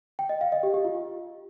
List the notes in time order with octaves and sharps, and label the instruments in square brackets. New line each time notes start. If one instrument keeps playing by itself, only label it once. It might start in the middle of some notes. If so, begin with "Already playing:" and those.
[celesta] G5
D#5
F5
D#5
G4
G4
F4